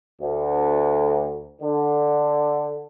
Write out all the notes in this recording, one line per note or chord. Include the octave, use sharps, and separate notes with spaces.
D2
D3